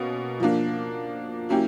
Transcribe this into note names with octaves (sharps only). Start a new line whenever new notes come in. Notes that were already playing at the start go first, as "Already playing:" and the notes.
Already playing: B2 A#3 C#4
F3 A#3 D4
F#3 A#3 C#4 E4 G4